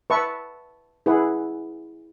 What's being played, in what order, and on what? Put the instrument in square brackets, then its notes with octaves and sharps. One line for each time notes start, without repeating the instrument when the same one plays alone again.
[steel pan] B4 E5 A5 C#6
E4 G#4 B4 F#5